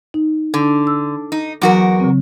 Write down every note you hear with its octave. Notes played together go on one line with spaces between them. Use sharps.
D#4
D3
E6
D#4
E2 F#3 F#4 A#4
C#3 C4